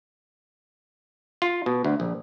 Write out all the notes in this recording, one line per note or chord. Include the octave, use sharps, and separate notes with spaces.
F4
B2
D2
A#1